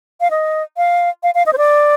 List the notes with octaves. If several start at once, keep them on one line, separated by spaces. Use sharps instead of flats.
F5
D#5
F5
F5
F5
D#5
C5
D5